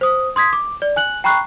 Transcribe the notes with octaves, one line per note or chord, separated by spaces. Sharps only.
C5 D#6
C6 D#6 G#6 B6
D6
D5
G#5 F#6 F#7
G5 A#5 B5 C#6 F#6 C7